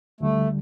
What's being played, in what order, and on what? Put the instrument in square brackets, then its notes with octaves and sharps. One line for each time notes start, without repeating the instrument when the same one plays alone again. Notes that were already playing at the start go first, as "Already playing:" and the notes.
[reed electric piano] D2 D3 G3 [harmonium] A3